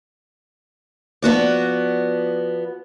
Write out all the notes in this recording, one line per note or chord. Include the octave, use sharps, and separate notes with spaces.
F3 B3 F#4 D5